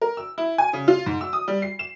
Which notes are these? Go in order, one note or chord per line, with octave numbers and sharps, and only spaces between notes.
A#4
E6
E4
G#5
C#3
F4
G#2
E6
D#6
G3
C7
E7